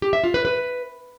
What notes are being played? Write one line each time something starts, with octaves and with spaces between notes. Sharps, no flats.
G4
E5
F4
B4
B4